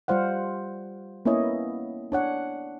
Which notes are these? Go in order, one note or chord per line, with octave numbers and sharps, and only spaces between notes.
G3 F4 C5 F5 F#5
A#3 B3 C#4 E4 C#5 D#5
D4 C#5 F#5